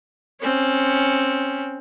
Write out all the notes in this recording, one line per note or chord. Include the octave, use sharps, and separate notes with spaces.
C4 C#4